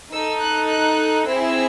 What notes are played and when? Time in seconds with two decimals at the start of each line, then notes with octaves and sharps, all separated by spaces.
0.12 D#4 A4 E6
0.41 F#6
0.70 F#6
1.28 C4 E4 G#4 E6